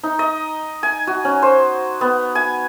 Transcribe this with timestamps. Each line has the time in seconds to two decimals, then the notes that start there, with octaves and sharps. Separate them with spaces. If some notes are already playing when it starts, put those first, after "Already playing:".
0.03 D#4
0.19 D#5
0.83 G#5
1.07 F#4
1.25 C#4
1.42 C5
2.01 B3
2.35 G#5